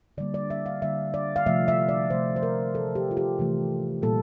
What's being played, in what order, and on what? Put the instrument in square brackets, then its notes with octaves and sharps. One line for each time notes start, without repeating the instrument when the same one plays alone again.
[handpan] D3 G3 A#3 D5
D5
E5
F5
D3 G3 A#3 E5
D5
F5
C3 F3 A3 E5
E5
D5
C3 F3 A3 C5
C5
A#4
C3 E3 A3 A4
G4
F4
G4
C3 E3 A3
A#2 G3 A#3 A4